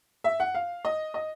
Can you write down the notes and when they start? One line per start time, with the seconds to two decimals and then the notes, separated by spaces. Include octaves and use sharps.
0.24 E5
0.40 F#5
0.54 F5
0.85 D#5
1.14 D#5